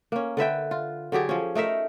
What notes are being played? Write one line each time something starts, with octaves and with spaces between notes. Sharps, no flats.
A#3 C#4
D3 B4 E5 G5
F4
D3 F#3 G4 G#4
F3 C#4
A3 D#4 A#4 E5